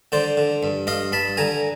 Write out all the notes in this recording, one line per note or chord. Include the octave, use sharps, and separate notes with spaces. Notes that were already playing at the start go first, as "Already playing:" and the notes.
D3 C5 D5
D3
G2
G2 D#5 F5
G2 A5 B5
D3 G#5 A#5